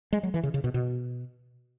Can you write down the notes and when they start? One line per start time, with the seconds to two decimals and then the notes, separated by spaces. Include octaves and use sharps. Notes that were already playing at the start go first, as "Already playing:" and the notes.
0.13 G#3
0.23 F#3
0.34 E3
0.43 C#3
0.54 C#3
0.64 B2
0.74 B2